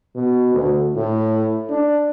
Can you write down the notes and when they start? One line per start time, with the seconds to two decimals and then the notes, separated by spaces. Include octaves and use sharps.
0.15 B2
0.54 D2
0.96 A2
1.69 D4